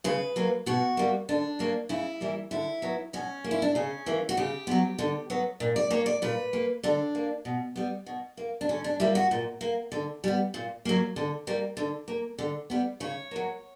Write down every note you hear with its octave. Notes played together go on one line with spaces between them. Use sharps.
C#3 B4
F#3 A#3
B2 F#4
G3 A#3
D3 D4
F#3 A#3
C#3 E4
E3 G3 A#3
D3 E4
F#3 B3
B2 C#4
A#3
E4
D4
C#3 C#4
E3 A#3
F#4
C#3 G4
F#3 B3
D3
F#3 B3
A#2
D5
A#3 C#5
D5
A#2 B4
A#3
D3 D4
A#3
B2
G3 B3
B2
A#3
D4
D3 C#4
D4
G3 A#3 E4
F#4
A#2
A#3
D3
G3 B3
A#2
F#3 A#3
D3
G3 A#3
D3
A#3
D3
G3 B3
C#3 C#5
F#3 A#3